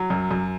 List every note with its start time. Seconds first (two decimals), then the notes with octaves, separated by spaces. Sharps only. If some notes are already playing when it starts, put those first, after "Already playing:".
Already playing: F#3
0.10 F#2
0.31 F#2